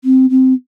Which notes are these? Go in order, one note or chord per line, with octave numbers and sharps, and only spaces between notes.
C4
C4